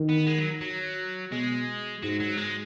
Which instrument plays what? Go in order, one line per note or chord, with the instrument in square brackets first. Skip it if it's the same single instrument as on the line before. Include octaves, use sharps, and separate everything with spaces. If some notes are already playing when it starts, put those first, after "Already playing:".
Already playing: [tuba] D#3
[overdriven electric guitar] B3
G#3
F#3
F#3
[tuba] B2 [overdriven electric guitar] G#3
[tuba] G#2 [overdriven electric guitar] F#3
[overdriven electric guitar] F#3
G#3